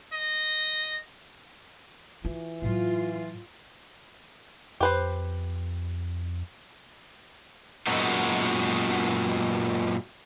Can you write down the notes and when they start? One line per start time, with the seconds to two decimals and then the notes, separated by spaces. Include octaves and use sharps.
0.13 D#5
2.25 E3 F4
2.62 A2 F#3 F4
4.81 F2 G4 B4 C5
7.87 F#2 A#2 G#3 B3 D#4 F#4